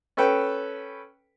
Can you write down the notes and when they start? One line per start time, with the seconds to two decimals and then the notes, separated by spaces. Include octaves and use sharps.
0.17 C#4 A4 B4 G5